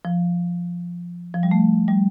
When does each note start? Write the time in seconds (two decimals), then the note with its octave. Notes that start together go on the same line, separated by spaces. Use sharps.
0.05 F3
1.34 F3
1.43 G3
1.51 A3
1.88 G3